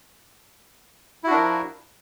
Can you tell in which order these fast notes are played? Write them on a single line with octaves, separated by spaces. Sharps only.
E4 F#4 D4 A#4 F3